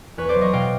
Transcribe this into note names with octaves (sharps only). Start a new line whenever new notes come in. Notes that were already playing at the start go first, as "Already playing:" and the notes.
E2 B4 C#5
C5 D5
F#3
C#5 D#5
B2 F5 G5